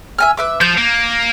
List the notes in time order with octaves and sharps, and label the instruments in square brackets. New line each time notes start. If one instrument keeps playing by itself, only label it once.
[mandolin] E5 G#5 F6
B4 E5 D6
[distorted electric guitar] F3 [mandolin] G6
[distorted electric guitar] A#3